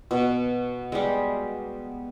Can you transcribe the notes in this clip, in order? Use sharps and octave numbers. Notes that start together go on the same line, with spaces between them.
B2
G3 G#3